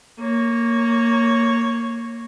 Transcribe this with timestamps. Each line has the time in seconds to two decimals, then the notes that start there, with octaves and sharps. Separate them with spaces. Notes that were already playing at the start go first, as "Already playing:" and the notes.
0.19 A#3 C#5